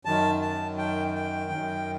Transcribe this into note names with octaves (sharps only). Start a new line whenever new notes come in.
F#2 D#3 A5
A5
G5
G5
F#2 D#3